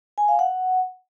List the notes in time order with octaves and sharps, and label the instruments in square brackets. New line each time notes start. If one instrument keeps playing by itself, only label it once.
[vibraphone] G#5
F5
F#5